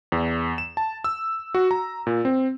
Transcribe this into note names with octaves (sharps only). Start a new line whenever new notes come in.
E2
E7
A5
E6
F#4
A#5
A#2
C4